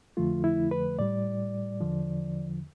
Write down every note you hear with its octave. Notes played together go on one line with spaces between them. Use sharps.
F2 D3 F3 A3 F4
E4
B4
A2 G3 D5
E2 D3 F3